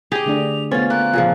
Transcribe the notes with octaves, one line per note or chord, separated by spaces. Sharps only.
G4 G#4 D#5 F7
D3 A3 D4
A3 B3 C#4 F4 C5 A6
A#3 F#6
A#2 C#3 F3